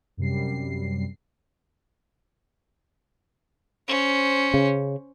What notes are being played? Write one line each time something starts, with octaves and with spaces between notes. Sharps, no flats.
F#2 C3 G3 C7
C#4 C5
C#3